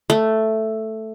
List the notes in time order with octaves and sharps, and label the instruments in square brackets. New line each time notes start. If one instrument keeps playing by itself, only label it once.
[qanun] A3